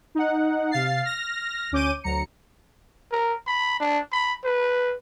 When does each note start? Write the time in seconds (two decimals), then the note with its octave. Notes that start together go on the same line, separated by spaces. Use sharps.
0.15 D#4 F#5
0.71 C3 F5 A6 C7
1.02 F6 A#6
1.71 D2 C#4 D6 G6 D#7
2.04 D2 F#3 A#5 C#7
3.11 A#4
3.47 B5
3.80 D4
4.12 B5
4.44 B4